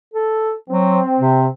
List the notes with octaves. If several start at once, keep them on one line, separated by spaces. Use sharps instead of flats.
A4
F#3 C4
C3